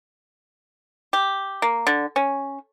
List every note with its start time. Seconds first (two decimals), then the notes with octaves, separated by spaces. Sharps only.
1.13 G4
1.62 A#3
1.87 D3
2.16 C#4